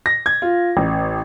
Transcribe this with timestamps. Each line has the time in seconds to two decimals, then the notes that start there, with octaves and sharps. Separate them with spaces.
0.06 A#6
0.26 G#6
0.42 F4
0.77 A1